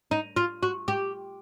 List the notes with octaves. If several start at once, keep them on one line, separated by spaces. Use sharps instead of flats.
D#4
F4
F#4
G4